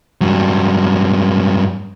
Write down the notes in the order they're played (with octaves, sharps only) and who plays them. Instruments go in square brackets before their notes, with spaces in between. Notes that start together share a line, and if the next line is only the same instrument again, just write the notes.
[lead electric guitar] G2 F#3